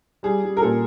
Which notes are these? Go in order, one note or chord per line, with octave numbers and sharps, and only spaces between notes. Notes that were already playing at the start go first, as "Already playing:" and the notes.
G3 G#4
G3
A#4
A#2 A4